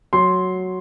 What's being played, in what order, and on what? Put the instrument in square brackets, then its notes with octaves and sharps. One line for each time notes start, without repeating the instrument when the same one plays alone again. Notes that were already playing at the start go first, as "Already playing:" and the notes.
[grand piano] F#3 C6